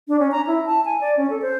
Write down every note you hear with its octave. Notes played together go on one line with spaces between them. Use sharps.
D4
C#4
A#5
E4
A5
G#5
D5
C#4
A4
C5